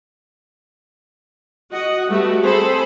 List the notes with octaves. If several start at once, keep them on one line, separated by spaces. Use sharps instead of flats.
F#4 D#5 F#5
G3 A3 B3 F#4 G4
C4 G#4 A4 C5 B5